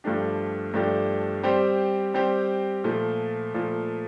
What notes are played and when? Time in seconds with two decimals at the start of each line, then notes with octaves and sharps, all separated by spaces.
0.04 G2 F3 A3 D4 G4
0.74 G2 F3 A3 D4 G4
1.43 G3 C4 G4 C5
2.14 G3 C4 G4 C5
2.84 A#2 F3 A3
3.54 A#2 F3 A3